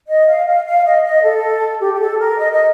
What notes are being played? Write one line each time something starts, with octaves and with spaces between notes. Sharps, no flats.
D#5
F5
F5
F5
D#5
D#5
A4
G4
G4
A4
A#4
D#5
D#5